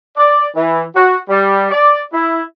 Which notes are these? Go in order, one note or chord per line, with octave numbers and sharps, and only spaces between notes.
D5
E3
F#4
G3
D5
E4